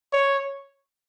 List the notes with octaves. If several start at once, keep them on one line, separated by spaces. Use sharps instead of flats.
C#5